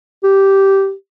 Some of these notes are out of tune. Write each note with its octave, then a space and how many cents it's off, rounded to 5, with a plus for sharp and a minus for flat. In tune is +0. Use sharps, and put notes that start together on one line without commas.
G4 -10